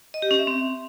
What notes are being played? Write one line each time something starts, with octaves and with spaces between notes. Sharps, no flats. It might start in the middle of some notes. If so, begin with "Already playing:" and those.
D#5
G4
C#4
E5
C4